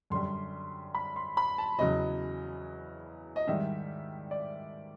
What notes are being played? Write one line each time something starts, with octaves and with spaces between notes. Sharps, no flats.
F#2 D3 G3 C6
B5
C6
B5
A5
E2 C#3 F#3 D#5
D#5
G#2 D#3 G3 E5
D5